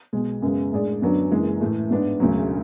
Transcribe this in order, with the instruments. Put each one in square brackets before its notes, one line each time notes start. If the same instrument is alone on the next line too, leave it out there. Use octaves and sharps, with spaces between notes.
[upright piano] B1 B2 G#3
F#2 C#3 G#3 B3
A2 G#3 D4 G#4 D5
F#2 D3 F#3 B3 D4
F#1 F#2 E3 G#3
A2 E3 A3
G#2 G#3 B3 D4
E1 D2 C#3 F#3